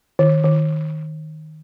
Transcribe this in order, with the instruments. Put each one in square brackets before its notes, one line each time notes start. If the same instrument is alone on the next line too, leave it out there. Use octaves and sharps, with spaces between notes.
[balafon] D#3
D#3